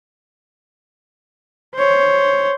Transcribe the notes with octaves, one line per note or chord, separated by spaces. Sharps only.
C5 C#5